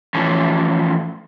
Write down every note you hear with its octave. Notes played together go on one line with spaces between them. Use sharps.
E3 F3 A3 C#4